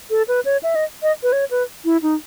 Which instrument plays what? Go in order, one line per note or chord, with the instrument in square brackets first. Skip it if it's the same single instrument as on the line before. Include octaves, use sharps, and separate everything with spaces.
[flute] A4
B4
C#5
E5
D#5
D#5
B4
C#5
B4
E4
D#4